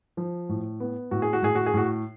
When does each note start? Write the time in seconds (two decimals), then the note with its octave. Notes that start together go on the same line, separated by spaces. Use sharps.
0.17 F3
0.49 A2
0.80 B3
1.11 A2 F#4
1.22 G#4
1.33 F#4
1.42 A2 G#4
1.55 F#4
1.66 G#4
1.74 A2 F#4